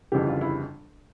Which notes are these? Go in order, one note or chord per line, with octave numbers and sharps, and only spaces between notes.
G1 F2 C#3 E3 G3 G4
F4
E4